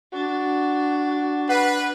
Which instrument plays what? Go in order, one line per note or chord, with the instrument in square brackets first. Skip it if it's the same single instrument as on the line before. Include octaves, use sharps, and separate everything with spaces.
[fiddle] D4 [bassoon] F#4
[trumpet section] B4 [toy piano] F#5